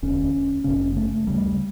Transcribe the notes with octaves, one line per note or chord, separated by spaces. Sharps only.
E1 D2 D3 C#4
G1 F#2 C#3 C#4
B3
A3
D2 C#3 G3